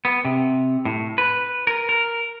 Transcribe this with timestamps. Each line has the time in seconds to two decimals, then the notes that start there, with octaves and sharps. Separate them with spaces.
0.05 B3
0.25 C3
0.85 A2
1.18 B4
1.67 A#4
1.89 A#4